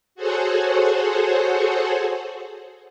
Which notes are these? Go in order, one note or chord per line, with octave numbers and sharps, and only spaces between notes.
F#4 G#4 A4 C5 C#5 F#5